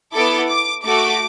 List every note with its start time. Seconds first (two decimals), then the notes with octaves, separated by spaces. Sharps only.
0.14 B3 E4 A4 D6
0.49 D6
0.85 A3 F#4 A4 D6